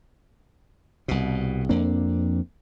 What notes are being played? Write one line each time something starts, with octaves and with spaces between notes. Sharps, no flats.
C2 B2
F2 A#3 C4 D4